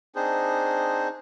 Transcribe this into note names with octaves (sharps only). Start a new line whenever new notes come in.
C4 D4 D#4 G#4 C5